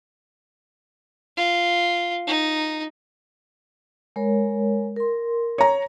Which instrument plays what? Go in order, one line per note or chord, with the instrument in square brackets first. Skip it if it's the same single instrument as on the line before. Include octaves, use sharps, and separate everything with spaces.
[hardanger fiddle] F4
D#4
[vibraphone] G#3 A#4 C#5
A#4 C6
[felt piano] C#5 A#5